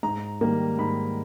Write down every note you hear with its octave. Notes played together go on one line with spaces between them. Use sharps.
G#2 A#5
D#3 G3 A#3
G#2 B5